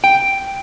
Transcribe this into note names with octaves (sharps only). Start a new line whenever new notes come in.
G5